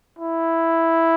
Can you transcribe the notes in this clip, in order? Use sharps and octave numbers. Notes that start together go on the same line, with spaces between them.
E4